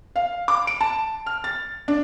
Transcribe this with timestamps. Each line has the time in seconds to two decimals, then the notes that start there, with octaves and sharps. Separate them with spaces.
0.16 F5
0.48 D6
0.67 D7
0.81 A5
1.26 F6
1.44 A6
1.88 D4